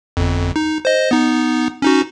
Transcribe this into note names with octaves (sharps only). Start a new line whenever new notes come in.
G1 F2
D#4
C5 D#5
B3 D#4
C#4 D#4 F#4